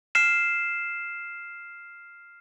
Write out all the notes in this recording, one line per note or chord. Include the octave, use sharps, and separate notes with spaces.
F6 C7 E7